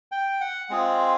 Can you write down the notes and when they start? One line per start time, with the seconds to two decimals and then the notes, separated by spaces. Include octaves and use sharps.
0.12 G5
0.41 F#5
0.70 G#3 C4 F4 G#4